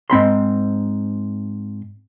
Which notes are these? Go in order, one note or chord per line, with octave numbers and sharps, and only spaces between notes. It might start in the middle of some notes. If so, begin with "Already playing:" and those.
G#2 C4 B5 C6